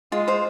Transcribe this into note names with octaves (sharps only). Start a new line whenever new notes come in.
G#3 F4
C5 F5